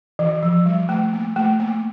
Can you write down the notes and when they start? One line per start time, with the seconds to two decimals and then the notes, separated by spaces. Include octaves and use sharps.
0.19 E3
0.43 F3
0.66 G3
0.89 A3
1.13 A#3
1.36 A3
1.60 A#3